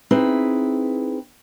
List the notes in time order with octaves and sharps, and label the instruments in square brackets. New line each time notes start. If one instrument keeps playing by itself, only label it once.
[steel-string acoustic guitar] C4 D#4 E4 G#4 B4